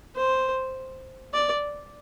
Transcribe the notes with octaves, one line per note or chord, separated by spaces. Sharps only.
C5
D5